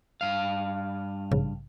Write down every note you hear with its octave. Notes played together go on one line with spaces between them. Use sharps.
G2 F5
A#1 G#2 C#3